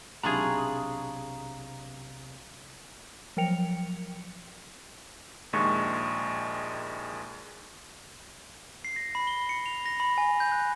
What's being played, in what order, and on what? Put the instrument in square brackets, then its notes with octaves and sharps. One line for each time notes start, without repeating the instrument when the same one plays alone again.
[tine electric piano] B1 C3 [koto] D4 F4 G#4 [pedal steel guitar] A#5 B5 C#6
[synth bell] F3 F#3 A#4 G5 C#7 F7
[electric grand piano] A#1 D#2 G#3 C#6
[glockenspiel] C7
A#6
B5
G7
C#7
F7
A#6
B5
G#5
G6
F#6